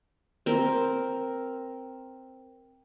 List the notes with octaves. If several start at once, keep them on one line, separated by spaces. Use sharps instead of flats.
C4 A#4